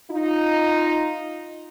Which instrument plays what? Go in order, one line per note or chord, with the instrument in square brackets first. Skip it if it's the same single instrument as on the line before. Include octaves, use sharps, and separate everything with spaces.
[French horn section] D#4 F4